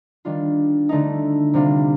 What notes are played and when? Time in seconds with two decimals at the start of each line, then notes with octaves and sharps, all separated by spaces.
0.25 D#3 G3 D4 F4
0.89 D3 A3 D#4
1.54 C3 G3 D4 F4